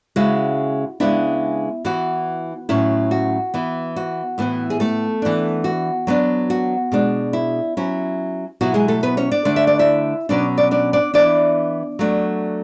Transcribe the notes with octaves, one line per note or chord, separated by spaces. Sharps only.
C#3 G#3 C#4 E4 F#4
C#3 G#3 B3 D4 E4
E3 B3 E4 F#4
A2 F#3 C#4 E4
F#4
E3 B3 E4
F#4
A2 E3 B3 E4
G#4
A3 A4
E3 B3 D4
F#4
F#3 B3 D4
F#4
B2 G#3 D4
E4
F#3 C#4 E4
B2 F#3 B3 E4 F#4
G#3 G#4
A3 A4
B3 B4
C#4 C#5
D4 D5
D3 A3 D4
E5
D5
E4 E5
B2 F#3 C#4 D4 D5
D4 D5
D4 D5
D4 D5
E3 B3 D4 E4 D5
F#3 A3 D4